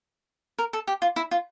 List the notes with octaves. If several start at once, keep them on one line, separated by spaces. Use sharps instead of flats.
A#4
A4
G4
F4
E4
F4